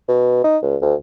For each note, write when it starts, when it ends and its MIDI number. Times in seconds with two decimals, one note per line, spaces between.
0.08 0.43 47
0.44 0.57 63
0.63 0.76 37
0.82 0.94 38